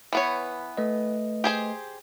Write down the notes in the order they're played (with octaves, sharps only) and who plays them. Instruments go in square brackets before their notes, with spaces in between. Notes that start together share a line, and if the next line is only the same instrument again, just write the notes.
[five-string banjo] E3 B3 C#5
[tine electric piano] A3 B4 D#5
[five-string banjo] G4 G#4 C5